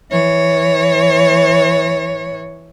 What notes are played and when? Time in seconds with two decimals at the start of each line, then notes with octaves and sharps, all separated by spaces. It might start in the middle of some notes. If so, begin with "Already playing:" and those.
0.11 E3 C#5